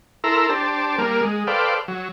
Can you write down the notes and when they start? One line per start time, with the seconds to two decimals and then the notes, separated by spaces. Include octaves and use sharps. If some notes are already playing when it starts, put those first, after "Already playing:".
0.24 E4 A4 A#4 A#5 C6 E6
0.49 D4 G4 C5 A5
0.98 G3 A#3 A#4
1.22 G#3
1.47 A4 B4 C5 D5 F5 G5
1.88 F#3